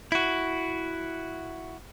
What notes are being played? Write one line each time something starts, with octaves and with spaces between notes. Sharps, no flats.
E4 F#4